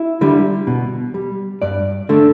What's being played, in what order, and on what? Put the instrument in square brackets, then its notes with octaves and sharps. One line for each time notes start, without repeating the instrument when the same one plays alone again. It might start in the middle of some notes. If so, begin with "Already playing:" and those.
Already playing: [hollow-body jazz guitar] E4
D3 G3
B2
G3
G2 D5
D3 A3